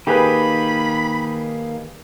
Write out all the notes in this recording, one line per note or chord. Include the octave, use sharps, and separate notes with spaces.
D#3 A#3 G4 G#4 B4 B5